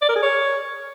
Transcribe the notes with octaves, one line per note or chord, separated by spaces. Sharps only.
D5
A#4
G#4
C#5